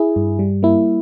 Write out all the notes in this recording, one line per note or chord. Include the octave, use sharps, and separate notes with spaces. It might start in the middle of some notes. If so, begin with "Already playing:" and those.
Already playing: E4 G#4
G2
G3
A#3 E4